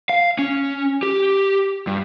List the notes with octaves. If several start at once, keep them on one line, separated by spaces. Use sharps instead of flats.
F5
C#4
G4
G2